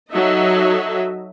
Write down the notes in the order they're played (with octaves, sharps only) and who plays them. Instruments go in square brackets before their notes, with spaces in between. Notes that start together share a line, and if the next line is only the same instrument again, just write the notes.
[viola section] F#3 D#4 A4 D#5 E5